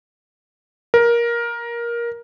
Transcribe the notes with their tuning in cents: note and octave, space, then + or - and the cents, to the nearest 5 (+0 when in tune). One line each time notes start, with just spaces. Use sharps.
A#4 +15